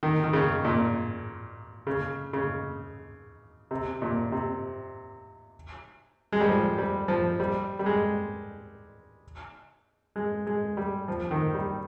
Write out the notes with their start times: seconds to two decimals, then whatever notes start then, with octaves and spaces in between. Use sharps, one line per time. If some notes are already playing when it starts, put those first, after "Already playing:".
0.03 D#3
0.24 D#3
0.33 C#3
0.65 A#2
1.87 C#3
2.33 C#3
3.71 C3
4.02 A#2
4.32 C3
6.32 G#3
6.40 G3
6.48 F3
6.78 G3
7.08 F3
7.40 G3
7.79 G3
7.86 G#3
10.16 G#3
10.47 G#3
10.77 G3
11.08 F3
11.31 D#3
11.54 G3